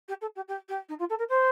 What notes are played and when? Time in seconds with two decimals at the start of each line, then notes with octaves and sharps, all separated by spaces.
0.08 G4
0.21 A4
0.36 G4
0.48 G4
0.68 G4
0.89 D#4
0.99 F4
1.10 A4
1.19 A#4
1.29 C5